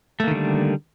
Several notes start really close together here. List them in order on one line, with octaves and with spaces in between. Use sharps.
A3 A#3 D#3 D3 G3